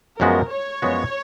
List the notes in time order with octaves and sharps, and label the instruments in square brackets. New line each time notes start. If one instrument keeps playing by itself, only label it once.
[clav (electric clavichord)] F#2 F3 G#3 B3 F#4 [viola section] A#4
[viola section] C#5
[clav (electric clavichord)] F#2 F3 G#3 B3 F#4